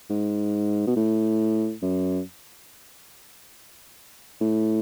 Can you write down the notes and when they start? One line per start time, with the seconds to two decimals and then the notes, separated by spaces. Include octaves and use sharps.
0.10 G#2
0.87 B2
0.96 A2
1.82 F#2
4.41 A2